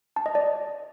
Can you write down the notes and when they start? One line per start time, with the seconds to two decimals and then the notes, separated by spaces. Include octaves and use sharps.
0.16 A5
0.26 D#5
0.35 D5